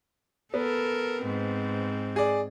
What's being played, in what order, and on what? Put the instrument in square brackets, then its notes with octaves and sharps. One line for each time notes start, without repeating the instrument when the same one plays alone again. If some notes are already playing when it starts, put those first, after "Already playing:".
[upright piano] B3 [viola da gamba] A4 A#4
[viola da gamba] G#2 C4
[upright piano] G#4 D5